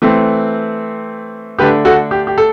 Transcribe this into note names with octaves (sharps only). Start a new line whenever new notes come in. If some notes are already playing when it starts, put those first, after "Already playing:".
E3 A3 C4
D3 A3 D4 G4 B4
F#4 A4
G4
G4
A4